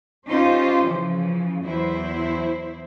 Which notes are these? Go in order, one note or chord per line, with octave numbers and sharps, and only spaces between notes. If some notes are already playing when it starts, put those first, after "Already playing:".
C#4 D#4 F4 G4 C5
C#3 E3 F3
E2 E3 F#3 E4 C5